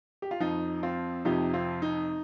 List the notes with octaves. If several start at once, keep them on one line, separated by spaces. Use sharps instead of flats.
G4
F4
F2 F3 D#4
C4 F4
F2 C3 F3 D#4 G4
C4 F4
D#4